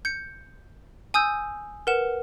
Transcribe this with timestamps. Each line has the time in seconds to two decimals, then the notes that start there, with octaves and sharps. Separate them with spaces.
0.05 G6 C#7
1.14 G#5 D#6 E6 G6
1.87 A#4 B4 F#5 E7